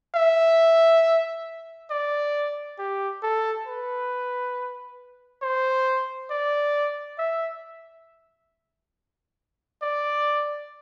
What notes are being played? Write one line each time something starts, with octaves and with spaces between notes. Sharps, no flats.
E5
D5
G4
A4
B4
C5
D5
E5
D5